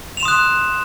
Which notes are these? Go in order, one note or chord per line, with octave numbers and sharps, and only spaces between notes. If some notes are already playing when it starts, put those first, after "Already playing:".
C6 D#6 F#6 E7 F7